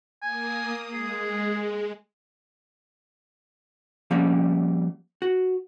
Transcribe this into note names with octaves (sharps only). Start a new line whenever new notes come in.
A#3 G#5 D#6
G#3 G#4
F3 G3 A#3 C#4
F#4